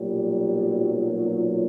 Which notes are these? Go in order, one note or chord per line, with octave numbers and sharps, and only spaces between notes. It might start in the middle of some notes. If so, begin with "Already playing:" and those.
Already playing: B1 A#2 F#3 G3